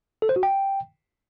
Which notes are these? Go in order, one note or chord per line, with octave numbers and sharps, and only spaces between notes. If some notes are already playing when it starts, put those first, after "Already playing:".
A4
C5
F#4
G5